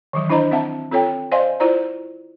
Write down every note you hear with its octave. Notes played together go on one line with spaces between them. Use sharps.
D#3 E3 F#3
D4 E4 C5 D#5 A#5 B5
C4 E5 F#5 A5
C4 F4 A4 C#5 G5
C5 D5 D#5 F5 G#5 C6
E4 F4 C5 D5 A#5